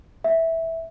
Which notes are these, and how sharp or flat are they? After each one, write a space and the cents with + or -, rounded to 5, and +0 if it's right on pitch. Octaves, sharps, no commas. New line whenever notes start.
E5 -10